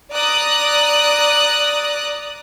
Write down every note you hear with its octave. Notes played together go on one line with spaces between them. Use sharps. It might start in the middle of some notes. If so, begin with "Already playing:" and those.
D5 A#5 D#6 F#6